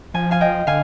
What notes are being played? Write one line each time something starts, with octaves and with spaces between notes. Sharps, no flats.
F3 G#5
F5 G#5
D#5 G5
D3 F5 G#5